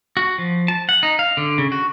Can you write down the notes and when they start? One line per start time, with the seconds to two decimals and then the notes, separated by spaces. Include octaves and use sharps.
0.17 F#4
0.38 F3
0.68 A5
0.89 F#5
1.03 D#4
1.19 F5
1.37 D3
1.58 C#3
1.72 F#4